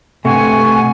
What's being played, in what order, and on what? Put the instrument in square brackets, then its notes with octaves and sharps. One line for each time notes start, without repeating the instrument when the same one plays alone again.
[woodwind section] G2 F#5 C#6 [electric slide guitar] C3 [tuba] A3 [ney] G#5